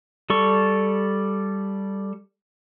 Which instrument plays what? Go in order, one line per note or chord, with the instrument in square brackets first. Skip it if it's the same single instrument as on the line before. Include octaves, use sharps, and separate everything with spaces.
[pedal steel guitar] G3 A4 C#6